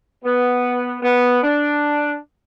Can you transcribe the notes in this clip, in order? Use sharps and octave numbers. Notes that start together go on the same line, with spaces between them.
B3
B3
D4